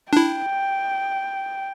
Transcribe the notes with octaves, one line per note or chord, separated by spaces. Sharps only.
D4 E4 G5